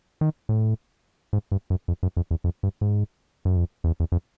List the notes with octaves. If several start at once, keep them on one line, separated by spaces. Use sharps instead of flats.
D#3
A2
G#2
G2
F#2
F2
F#2
F2
E2
F2
G2
G#2
F#2
F2
E2
E2
F2